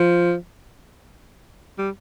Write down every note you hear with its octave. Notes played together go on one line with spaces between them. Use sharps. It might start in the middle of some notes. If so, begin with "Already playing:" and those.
Already playing: F3
G3